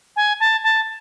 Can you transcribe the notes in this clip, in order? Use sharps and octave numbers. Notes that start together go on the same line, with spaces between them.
G#5
A5
A5